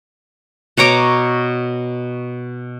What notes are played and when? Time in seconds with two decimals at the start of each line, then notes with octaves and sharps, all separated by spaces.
0.77 B2 C#5 A#5 D6